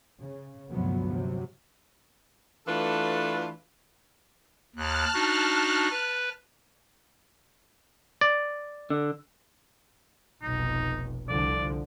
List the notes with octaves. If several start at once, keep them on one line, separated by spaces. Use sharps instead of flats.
C#3
D2 G2 C3 F3 F#3 B3
C3 F#3
E3 A3 D4 F4 A4 B4
D#2 A5 F6 F#6
D4 D#4 F#4
B4
D5
D3
F1 B1 D#4
C2 D3 F3 D5